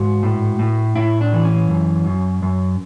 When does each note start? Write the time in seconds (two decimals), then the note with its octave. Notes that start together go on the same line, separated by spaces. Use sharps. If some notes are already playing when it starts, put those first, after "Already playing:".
Already playing: G#2 F#4
0.23 A2
0.59 A2
0.96 A2 E4
1.21 D4
1.33 E3
1.45 C#4
1.69 F#2
2.06 F#2
2.42 F#2